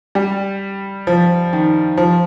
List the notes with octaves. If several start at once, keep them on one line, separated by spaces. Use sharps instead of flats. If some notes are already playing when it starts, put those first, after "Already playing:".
G3
F3
D#3
F3